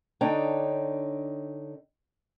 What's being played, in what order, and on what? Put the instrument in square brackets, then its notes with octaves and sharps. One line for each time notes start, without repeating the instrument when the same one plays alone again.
[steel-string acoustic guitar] D3 D4 D#4 C#5 G5